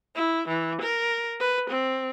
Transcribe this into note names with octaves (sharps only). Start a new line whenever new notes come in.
E4
E3
A#4
B4
C4